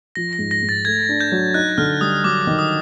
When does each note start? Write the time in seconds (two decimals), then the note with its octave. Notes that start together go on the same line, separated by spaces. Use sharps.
0.15 F3 A#6
0.33 A#6
0.39 G#2
0.51 A#6
0.63 G#2
0.69 A6
0.85 A3 G#6
1.09 D4
1.21 G6
1.32 F#3
1.54 D#4 F#6
1.78 D3 F6
2.01 G3 D#6
2.24 F#3 D6
2.47 D#3
2.59 D#6